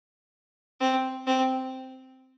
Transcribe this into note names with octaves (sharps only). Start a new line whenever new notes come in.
C4
C4